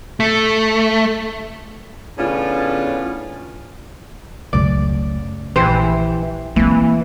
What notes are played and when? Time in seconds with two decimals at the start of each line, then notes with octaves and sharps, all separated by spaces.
0.20 A3
2.18 A2 C#3 B3 C#4 D4 F4
4.53 F#1 C#2 F#2 C#3 A3 D5
5.56 A#1 E3 G4 C5
6.56 E3 A#3 C4